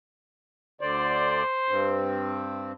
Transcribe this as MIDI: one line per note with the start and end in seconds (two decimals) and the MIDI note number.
0.81 1.43 38
0.81 1.43 50
0.81 2.06 72
0.81 1.43 74
1.69 2.72 43
1.69 2.72 60